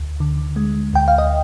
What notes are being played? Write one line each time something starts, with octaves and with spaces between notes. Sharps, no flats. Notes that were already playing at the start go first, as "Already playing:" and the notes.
Already playing: D2
D3
G#3
D2 G5
F5
D#5